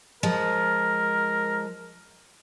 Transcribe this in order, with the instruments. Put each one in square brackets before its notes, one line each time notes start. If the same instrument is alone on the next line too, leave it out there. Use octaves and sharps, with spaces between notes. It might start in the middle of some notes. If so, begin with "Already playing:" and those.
[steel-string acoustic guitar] F3 G#3 [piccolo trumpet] A#4